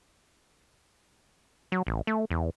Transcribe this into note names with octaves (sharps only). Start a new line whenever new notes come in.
F#3
A1
A3
E2